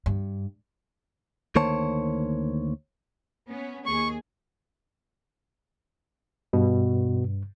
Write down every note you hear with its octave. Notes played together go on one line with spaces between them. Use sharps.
G2
D2 D#3 A#3 C5 C#5 A5
B3 C#4
D#2 G#4 C#6
G2 B2